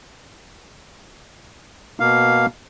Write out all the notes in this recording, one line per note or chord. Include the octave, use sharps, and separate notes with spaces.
B2 A#3 F5